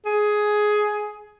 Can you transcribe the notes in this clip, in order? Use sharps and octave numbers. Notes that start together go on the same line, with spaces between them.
G#4